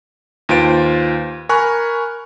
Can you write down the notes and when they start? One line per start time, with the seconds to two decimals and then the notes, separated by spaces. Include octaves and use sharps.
0.49 D#2 F4 B4 C5 D7
1.49 A#4 G#5 B5 C#6 F6 F#6